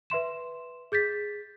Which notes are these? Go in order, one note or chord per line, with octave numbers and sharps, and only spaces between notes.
B4 E5 C6 E7
G#4 G6 A6 B6